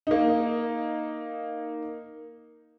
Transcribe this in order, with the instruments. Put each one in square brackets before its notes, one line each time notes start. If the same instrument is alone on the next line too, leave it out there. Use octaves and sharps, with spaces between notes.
[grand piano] A#3 D#4